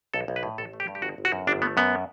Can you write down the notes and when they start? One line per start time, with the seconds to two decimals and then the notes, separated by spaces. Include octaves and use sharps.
0.14 B1 A4
0.28 B1
0.36 B4
0.43 A2
0.58 A1 A4
0.73 A3
0.80 G4
0.88 G2
0.95 G4
1.02 G1 F#4
1.18 G1
1.25 F#4
1.32 F#2
1.47 G1 D4
1.62 A3 B3
1.77 F#2 B3